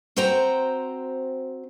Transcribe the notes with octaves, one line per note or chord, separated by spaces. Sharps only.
C4 F#4 C5 G5 A#5